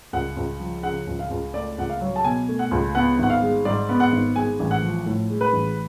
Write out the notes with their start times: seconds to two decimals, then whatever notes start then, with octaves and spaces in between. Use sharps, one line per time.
0.13 C#2 F#5
0.37 C#2
0.60 F3
0.83 C#3 F#5
1.07 C#2
1.19 F5
1.31 C#2
1.54 A3 D5
1.78 C#2 F#5
1.89 F5
2.01 F#3
2.16 A5
2.24 B2 G#5
2.48 A3
2.59 F#5
2.71 C#2
2.95 B3 F#5
3.19 G#1 F#5
3.30 F5
3.42 G#3
3.65 G#2 D5
3.89 B3
4.00 F#5
4.12 G#1
4.36 G#3 G#5
4.59 A1
4.71 F#5
4.82 F3
5.06 A2
5.30 G#3
5.41 B4
5.53 A1